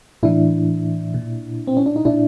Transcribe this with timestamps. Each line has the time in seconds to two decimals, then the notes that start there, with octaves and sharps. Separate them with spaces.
0.23 A2 E3 D4 E4
1.14 A#2
1.67 C4
1.77 C#4
1.86 D4
1.96 D#4
2.05 A#2 D4 E4